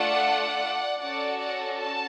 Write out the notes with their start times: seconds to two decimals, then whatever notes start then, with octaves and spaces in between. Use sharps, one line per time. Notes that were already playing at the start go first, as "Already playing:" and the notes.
Already playing: A3 D4 F4 A4 D5 F#5
1.00 C#4 F#4 A4 D5 F#5
1.38 D5 F#5
1.78 A5